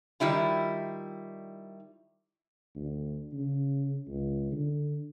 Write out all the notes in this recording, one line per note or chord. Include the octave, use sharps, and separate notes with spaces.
D#3 G3 E4 F4
D2
C#3
C#2
D3